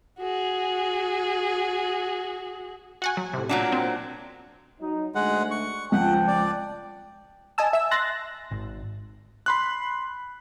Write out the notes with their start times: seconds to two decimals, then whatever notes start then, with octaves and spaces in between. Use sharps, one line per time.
0.19 F#4 G#4
3.02 F#4 F#5 G#5
3.17 F#3
3.33 A2 C3
3.49 A#2 F#3 D4
3.72 C4
4.81 F#3 D#4
5.15 D2 G#3 F#5
5.51 C#6
5.92 C#2 F3 F#5 G5 A5
6.27 D5
7.58 D#5 G#5 A5 E6
7.73 E5 E6
7.91 C6 F#6 A6 A#6
8.51 G#1
9.46 B5 C6 F#6